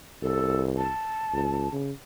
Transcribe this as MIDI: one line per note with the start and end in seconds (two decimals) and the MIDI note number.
0.22 0.91 36
0.22 0.62 69
0.77 1.71 81
1.33 1.70 37
1.72 1.92 49